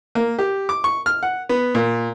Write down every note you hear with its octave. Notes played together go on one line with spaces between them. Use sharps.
A#3
G4
D6
C#6
F6
F#5
B3
A#2